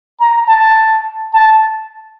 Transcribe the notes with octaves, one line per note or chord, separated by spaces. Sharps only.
A#5
A5
A5